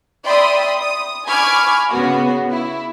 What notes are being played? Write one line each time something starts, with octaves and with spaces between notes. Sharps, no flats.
D5 E5 G5 B5 C6 D#6
D#6
G#5 B5 C#6 D6 F6 G#6
C#3 B3 F#4
E4